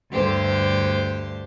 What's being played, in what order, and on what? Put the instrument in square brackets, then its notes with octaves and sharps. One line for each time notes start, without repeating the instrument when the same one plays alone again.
[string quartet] D2 G2 D3 G4 C5